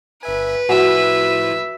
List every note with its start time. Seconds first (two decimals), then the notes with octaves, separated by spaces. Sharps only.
0.23 G1 B4 E5 G#5
0.69 A2 F3 E4 F#4 E5 F#5 G#5